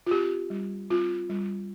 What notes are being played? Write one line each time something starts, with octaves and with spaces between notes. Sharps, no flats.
F4
C4 G4
G3
C4 F4
G3